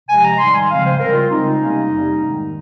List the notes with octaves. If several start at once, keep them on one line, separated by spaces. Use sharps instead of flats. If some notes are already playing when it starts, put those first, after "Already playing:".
C3 F3 G#3 G#5
A#5
G#2 D#3 G3 C6
G#5
C#3 F3 G#3 C4 F5
C5
C#3 G3 C4 A#4
F4
C#3 G#3 C4 D#4
C3 G3 A#3 C#4
F2 C3 G3 A#3
G#2 D#3 G#3